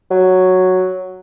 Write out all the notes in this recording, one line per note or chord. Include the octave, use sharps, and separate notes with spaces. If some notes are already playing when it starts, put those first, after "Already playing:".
F#3